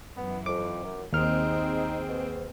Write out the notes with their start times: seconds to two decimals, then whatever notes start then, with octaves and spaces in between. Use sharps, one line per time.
0.16 F#2 E3 B3
0.46 F2 D6
0.84 F#2
1.13 D#2 A#3 C4 D#4 G#4 F6
2.08 G#2 B2